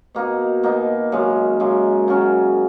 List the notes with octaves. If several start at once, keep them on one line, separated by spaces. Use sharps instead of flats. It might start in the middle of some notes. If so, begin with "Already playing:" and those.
B2 A#3 D#4
B2 A#3 D#4
F#2 C#3 G#3
F#2 C#3 G#3
C#3 F#3 C#4